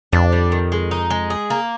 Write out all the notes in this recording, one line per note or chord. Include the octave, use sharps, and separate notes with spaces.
F2 D4
G3
D#3
G#3
D#4
G#3
G#4
A#3